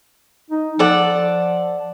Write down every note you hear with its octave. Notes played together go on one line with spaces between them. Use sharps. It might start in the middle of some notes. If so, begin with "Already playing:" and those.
D#4
F3 A4 D5 F#5